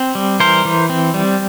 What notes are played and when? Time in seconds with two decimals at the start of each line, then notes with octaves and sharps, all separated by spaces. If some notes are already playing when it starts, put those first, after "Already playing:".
Already playing: C4
0.15 G3
0.40 E3 A#4 C5
0.65 E3
0.90 C4
1.14 G3